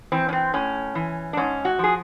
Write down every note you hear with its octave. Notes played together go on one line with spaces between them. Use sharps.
E3 C4
C#4
C4
A2 C#4
E3
D4
G#2 C#4
F#4
F3 G#4